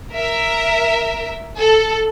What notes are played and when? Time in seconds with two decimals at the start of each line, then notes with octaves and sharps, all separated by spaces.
0.13 A#4 E5
1.59 A4